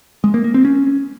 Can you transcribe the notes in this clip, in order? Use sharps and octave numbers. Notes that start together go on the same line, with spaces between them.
G#3
A#3
A#3
C4
C#4